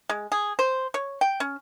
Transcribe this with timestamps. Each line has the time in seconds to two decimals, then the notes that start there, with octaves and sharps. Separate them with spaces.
0.09 G#3
0.32 G#4
0.59 C5
0.94 C#5
1.21 G5
1.40 C#4